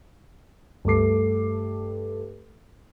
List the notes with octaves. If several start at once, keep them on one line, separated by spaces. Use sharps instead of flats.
G2 A3 A4 D6 C7